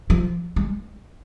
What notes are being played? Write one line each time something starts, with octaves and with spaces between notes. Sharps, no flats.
F3
G#3